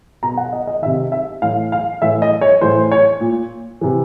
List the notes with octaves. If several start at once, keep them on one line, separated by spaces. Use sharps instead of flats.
B2 A#5
F#5
D#5
D#5
C3 D#3 E5
E5
A2 E3 F5
F5
A2 E3 E5
D#5
C#5
A2 E3 C5
C#5
A#2
C3 E3